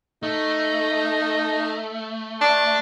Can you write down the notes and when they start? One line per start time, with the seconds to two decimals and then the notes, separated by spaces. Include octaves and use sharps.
0.23 A3 D#4
2.41 D4